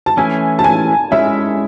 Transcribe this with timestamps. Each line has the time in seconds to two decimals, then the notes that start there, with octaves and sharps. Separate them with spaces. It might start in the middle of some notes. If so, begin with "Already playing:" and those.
0.06 A5
0.17 E3 A3 C#4 E4 G#5
0.59 A5
0.64 G#5
1.12 G#3 C#4 E4 E5